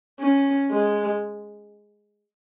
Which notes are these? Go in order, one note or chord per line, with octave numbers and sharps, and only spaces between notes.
C#4
G#3